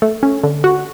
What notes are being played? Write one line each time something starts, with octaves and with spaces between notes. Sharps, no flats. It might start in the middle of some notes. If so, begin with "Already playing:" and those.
A3
C#4
D3
F#4